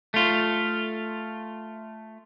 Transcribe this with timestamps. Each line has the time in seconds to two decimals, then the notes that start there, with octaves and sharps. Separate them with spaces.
0.14 A3 F4